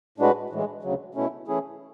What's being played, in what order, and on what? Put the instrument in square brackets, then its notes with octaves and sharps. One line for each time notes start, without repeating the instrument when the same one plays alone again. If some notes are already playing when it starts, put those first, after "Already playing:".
[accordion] A2 G#3 D4 F#4 B4
A2 E3 G#3
D2 C#3 F#3
B2 A3 C#4 E4
E3 A3 C#4 E4 G#4